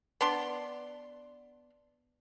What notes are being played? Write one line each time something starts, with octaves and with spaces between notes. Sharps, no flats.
B3 D4 C6